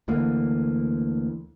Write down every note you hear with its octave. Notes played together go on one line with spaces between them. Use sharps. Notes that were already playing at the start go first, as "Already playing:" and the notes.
D2 D3 E3 A#3